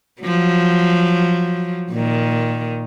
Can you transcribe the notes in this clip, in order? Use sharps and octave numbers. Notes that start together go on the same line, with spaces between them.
F3 F#3
A#2 D#3